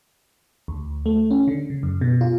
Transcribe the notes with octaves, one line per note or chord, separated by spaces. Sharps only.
D2
A3
C#4
D3
C#3
F#2
B2
F4